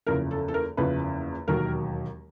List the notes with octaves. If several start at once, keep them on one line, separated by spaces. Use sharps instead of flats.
F#1 E2 C#3 F3 A#4
A4
A4
A#4
F#1 E2 C#3 F3 B4
E1 D#2 D#3 F#3 A#4